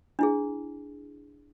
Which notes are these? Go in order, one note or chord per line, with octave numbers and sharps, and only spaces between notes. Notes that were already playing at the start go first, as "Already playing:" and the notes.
D4 E4 G#4